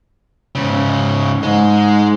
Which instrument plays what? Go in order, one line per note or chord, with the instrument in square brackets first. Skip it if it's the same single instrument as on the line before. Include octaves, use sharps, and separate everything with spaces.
[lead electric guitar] G#2 C#3
[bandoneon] G#2 [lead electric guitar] G#3